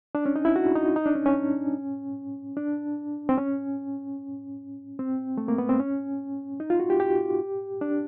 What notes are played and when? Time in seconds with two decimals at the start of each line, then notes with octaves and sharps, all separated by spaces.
0.15 D4
0.26 C#4
0.36 D#4
0.45 E4
0.56 F#4
0.75 D#4
0.96 D#4
1.06 D4
1.15 C#4
1.26 C#4
2.57 D4
3.29 C4
3.38 C#4
4.99 C4
5.37 A3
5.48 A#3
5.58 B3
5.69 C4
5.80 C#4
6.60 D#4
6.70 F4
6.80 F#4
6.90 G4
7.00 G4
7.81 D4